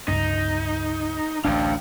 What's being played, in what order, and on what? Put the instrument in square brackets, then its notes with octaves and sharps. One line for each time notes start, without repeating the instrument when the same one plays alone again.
[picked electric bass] G1 C#2 G2 [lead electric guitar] D#4
[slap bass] A1 D2 D4 [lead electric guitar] F5 G5